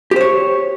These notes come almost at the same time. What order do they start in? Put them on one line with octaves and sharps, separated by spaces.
G4 C5 C#5